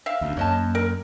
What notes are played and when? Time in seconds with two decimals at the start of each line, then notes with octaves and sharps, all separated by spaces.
0.06 E5 F5
0.21 D2 D4
0.37 F#2 A#3 C#5 D#5 A5
0.75 A#4